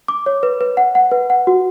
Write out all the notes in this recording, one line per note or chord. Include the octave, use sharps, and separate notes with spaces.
D6
C#5
B4
B4
F#5
F#5
B4
F#5
F#4